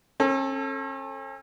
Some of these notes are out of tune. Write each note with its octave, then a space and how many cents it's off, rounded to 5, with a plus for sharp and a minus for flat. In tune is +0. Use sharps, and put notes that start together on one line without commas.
C#4 -40 A4 +0